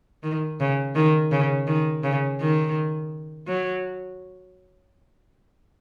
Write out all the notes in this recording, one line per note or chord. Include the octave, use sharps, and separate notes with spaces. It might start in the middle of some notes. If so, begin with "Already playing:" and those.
D#3
C#3
D#3
C#3
D#3
C#3
D#3
F#3